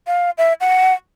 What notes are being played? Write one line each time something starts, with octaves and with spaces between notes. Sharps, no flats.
F5
E5
F#5